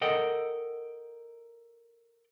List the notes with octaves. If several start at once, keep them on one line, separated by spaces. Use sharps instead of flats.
A4 A#4 D#5 F#5 G5